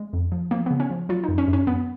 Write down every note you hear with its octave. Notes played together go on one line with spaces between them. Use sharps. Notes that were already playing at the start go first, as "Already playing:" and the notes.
Already playing: G#3
F2
F3
F3 A#3
C#3 B3
C#4
F3
F#3 F4
F#2 D#4
C#4
F#2
C#4
F#2 B3